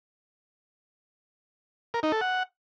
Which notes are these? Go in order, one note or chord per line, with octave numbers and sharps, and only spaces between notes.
A#4
D#4
A4
F#5